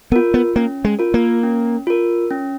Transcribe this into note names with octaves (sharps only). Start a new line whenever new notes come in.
B3 F4 A#4
B3
A#3 C#4
G#3
F4 A#4
A#3
C#4
F4 A#4
C#4